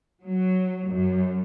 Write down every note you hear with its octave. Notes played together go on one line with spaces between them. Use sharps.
F#3
F#2